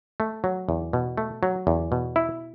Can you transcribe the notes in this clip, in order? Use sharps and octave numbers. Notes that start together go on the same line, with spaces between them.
A3
F#3
E2
B2
A3
F#3
E2
B2
E4